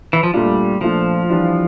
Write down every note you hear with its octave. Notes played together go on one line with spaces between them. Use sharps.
E3
F3
A#2 G3 A3 D4 F4
A#2 F3 A3 D4 F4
E3 G3 D4 F4